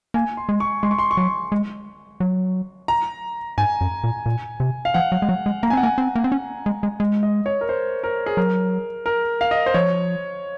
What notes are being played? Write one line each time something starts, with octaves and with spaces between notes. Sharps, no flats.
A#3 G#5
C6
G#3
C#6
G#3 C6
C#6
C6
C#6
F#3 C6
G#3
F#3
A#5
G#2 G#5
F#2
A#2
A#2
C3
F5
F3 F#5
F#3
G#3
F#3
G#3
A#3 A#5
G#5
C4 F#5
A#3 G#5
C4
A#3
C4
C#4
G#3
G#3
G#3
D#5
C#5
A#4
C5
A#4
G#4
F#3 A#4
A#4
F5
D#5
C5
F3 C#5